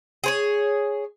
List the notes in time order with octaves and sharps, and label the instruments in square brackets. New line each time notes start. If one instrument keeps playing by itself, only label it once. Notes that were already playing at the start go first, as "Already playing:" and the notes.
[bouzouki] G#4 C5 C#5